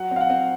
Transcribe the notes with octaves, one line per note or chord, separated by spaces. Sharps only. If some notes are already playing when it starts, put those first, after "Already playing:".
Already playing: F#3 F#4 F#5
C4
F5
F#5
C4